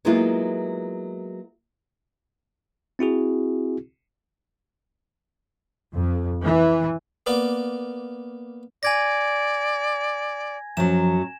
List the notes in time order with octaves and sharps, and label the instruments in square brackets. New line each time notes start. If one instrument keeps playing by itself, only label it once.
[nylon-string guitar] F#3 G#3 A#3 B3 E4 F4
[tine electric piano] C4 E4 F#4 G#4
[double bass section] F2
E3
[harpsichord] A#3 B3 D5
[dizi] D5 [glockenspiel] G#5 G#6 A#6
[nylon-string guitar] F#2 F#3 [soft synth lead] F3 [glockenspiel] E7